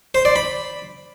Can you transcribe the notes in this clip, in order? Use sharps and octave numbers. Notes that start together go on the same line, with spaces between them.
C5
D5
B5